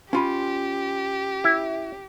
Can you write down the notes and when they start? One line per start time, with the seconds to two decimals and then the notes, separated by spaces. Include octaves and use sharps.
0.13 C#4 F4 G4 B5
1.44 E4